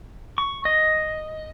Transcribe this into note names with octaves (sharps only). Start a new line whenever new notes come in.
C#6
D#5